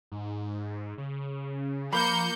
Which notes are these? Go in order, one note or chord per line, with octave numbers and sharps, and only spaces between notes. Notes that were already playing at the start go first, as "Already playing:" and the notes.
G#2
C#3
F3 A#3 F5 B5 G6 C#7